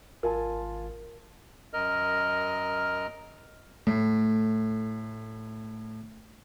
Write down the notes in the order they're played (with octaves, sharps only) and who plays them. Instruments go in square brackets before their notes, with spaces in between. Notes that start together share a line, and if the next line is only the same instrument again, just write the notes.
[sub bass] G#1 [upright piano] F4 G#5 A5 [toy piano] A#4
[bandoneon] F#2 A#4 D#5 F6
[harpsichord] A2 [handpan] A3